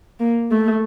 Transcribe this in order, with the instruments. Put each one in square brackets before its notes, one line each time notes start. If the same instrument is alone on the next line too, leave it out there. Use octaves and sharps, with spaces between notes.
[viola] A#3
A3